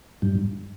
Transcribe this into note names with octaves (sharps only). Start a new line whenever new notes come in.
G2